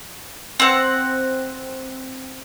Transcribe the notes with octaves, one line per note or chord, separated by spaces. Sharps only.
C4 F#5